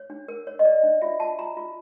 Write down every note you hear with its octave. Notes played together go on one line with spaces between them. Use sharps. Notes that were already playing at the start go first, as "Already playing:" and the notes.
Already playing: C#5
D4
A#4
C#5
D#5
C#5 D5
D4
F4 E5
F4 A5
F4 A#5
F4